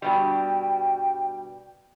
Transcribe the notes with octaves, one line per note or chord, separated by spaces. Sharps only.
G2 B2 G3 G5